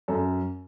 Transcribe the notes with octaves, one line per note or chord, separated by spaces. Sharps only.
F#2 A4